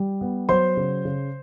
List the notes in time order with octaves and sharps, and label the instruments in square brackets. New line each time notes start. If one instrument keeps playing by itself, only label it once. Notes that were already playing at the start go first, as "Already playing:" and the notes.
Already playing: [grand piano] G3
B3
F#3 C5 C6
C#3
C#3